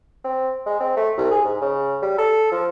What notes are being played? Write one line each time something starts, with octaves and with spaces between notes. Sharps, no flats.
C4
G#3
C4
A3
C2
G#4
G#2
C#3
G3
A4
F3